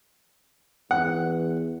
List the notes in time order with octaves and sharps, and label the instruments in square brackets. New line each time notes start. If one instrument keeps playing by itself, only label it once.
[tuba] E2 [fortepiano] F#5